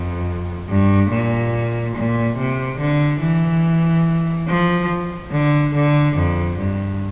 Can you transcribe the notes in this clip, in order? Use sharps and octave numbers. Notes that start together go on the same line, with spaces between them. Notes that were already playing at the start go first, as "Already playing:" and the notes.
Already playing: F2
G2
A#2
A#2
C3
D3
E3
F3
D3
D3
F2
G2